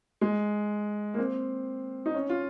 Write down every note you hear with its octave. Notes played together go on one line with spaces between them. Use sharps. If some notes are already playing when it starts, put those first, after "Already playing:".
G#3
A#3
C4
D#4
C#4
F4